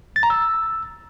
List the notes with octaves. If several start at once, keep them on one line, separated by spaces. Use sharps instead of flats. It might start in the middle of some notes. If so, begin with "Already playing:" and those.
A6
A#5
E6